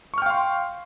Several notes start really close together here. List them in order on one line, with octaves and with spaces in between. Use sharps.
C#6 F6 G5 F5 C6